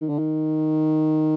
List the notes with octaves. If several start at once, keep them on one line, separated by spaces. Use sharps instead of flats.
D#3
D3
D#3